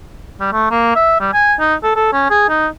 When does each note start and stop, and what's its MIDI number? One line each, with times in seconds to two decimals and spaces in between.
0.40 0.49 55
0.53 0.67 57
0.71 0.96 58
0.96 1.17 76
1.21 1.33 55
1.34 1.54 80
1.60 1.74 63
1.84 1.91 69
1.96 2.12 69
2.13 2.27 61
2.30 2.47 68
2.50 2.67 63